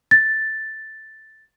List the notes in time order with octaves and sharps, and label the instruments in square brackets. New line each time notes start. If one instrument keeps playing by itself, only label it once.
[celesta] A6